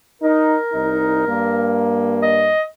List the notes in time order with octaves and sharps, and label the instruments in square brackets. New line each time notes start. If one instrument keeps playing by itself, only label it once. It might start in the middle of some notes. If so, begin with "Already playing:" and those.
[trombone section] D#4 [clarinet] A#4
[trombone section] C2 D#4
G2 A#3
[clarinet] D#5